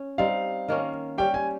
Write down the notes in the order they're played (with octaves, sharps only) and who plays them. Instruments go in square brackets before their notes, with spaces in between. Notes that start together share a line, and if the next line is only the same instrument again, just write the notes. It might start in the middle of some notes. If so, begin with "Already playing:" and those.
Already playing: [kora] C#4
[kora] G3 C4 D#4 [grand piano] F5
[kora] D#3 A#3 C#4
[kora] G3 C#4 G4 [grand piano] G5
[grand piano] G#5